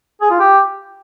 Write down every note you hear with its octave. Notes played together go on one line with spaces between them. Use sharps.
G#4
F4
G4